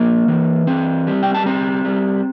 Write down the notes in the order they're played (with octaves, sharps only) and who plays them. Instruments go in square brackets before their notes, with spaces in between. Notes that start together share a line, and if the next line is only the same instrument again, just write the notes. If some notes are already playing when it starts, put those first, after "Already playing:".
Already playing: [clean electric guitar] F3 A#3 A#5
E3
C4
G3
G5
A5
C4 A#5
G3